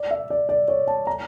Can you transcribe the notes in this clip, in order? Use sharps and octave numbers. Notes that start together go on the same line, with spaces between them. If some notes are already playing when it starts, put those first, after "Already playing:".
Already playing: D5
E5
D5
D5
C#5
A5
A#5